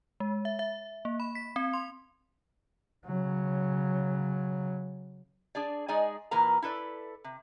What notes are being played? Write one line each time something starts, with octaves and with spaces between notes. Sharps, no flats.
G#3
E5
E5
A#3
B5
B6
C4
C6
C#3 F#3
D4 G#4 D5
G#3 D#4 G#4 D5 D#5 G#5
A#2 E3 A#3 A#4 B4 A#5
E4 A4 B4 D5
C3